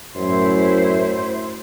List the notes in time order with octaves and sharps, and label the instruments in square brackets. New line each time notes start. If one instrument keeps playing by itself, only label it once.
[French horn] F#2 [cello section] A2 E4 C5